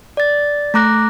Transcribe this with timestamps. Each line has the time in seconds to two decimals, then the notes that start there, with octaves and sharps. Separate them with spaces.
0.17 D5 A6
0.74 A3 A#5 D6 F#6 A#6